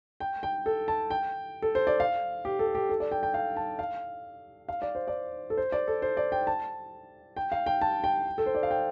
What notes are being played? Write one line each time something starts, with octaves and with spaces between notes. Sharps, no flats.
G5
G5
A4
A5
G5
A4
C5
D5
F5
G4
A4
G4
A4
D5
G5
G5
F5
A5
F5
F5
D5
C5
D5
A4
C5
D5
A4
C5
D5
G5
A5
G5
F5
G5
A5
G5
A4
C5
D5
F5
G5